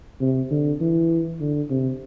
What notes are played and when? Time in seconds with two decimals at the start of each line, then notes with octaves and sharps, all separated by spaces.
0.21 C3
0.51 D3
0.81 E3
1.41 D3
1.70 C3